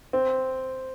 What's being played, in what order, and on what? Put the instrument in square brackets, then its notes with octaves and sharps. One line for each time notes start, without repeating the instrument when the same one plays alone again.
[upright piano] C4